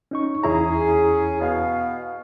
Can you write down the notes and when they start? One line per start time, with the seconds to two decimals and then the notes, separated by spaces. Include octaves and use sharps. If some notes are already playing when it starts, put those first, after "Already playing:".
0.11 C#4 D#4 C#6
0.44 E2 C#4 E4 G#4 A#5
1.40 B2 B3 F5